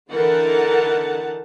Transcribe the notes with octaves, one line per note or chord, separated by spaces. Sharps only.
D3 E3 D#4 A#4 F#5 A5